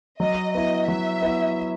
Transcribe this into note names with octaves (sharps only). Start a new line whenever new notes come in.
F#3 D#5
B3 E4 D#5
F#3 E5
B3 E4